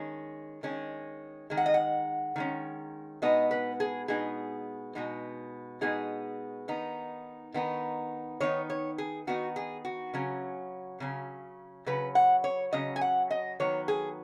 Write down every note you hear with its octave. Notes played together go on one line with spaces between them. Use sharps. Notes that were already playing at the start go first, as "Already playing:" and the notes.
Already playing: D#3 G#3 C#4
D#3 G#3 C#4
D#3 G#3
F#5
D#5
F#5
D#3 G#3 C#4
B2 G#3 B3 D#4 D#5
B4
G#4
B2 G#3 B3 D#4 G#4
B2 G#3 B3 D#4
B2 G#3 B3 D#4 G#4
D#3 B3 D#4
D#3 B3 D#4
D#3 B3 D#4 C#5
C#5
G#4
D#3 B3 D#4 F#4
G#4
F#4
C#3 F#3 C#4
C#3 F#3 C#4
C#3 F#3 C#4 B4
F#5
C#5
C#3 F#3 C#4 D#5
G#5
F#5
D#5
D#3 F#3 B3 C#5
G#4